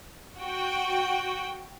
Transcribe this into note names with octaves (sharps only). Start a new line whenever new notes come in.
F#4 G5